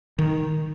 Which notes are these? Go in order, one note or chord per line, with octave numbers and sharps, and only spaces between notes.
D#3